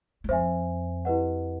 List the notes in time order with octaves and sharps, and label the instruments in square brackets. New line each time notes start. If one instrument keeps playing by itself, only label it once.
[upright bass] E2
[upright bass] F2 [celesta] C5 E5 G#5
[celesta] E4 G4 B4 D#5 F#5